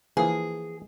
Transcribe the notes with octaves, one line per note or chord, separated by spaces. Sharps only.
E3 F3 A#3 G#4